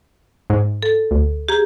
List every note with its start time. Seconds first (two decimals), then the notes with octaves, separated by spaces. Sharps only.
0.50 G#2
0.82 A4
1.11 D2
1.49 G4 G#4 A#5